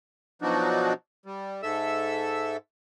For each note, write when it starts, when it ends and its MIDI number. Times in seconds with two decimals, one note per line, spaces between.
0.42 0.93 47
0.42 0.93 53
0.42 0.93 54
0.42 0.93 62
0.42 0.93 63
0.42 0.93 66
1.26 1.62 55
1.63 2.57 44
1.63 2.57 69
1.63 2.57 76
1.63 2.57 88